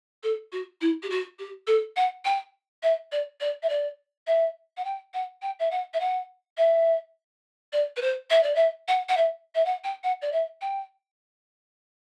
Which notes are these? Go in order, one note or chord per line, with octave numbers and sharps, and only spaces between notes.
A4
F#4
E4
G4
F#4
G4
A4
F#5
G5
E5
D5
D5
E5
D5
E5
F#5
G5
F#5
G5
E5
F#5
E5
F#5
E5
D5
B4
C5
E5
D5
E5
F#5
F#5
E5
E5
F#5
G5
F#5
D5
E5
G5